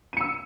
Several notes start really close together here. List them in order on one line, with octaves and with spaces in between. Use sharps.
D#7 C#7 E6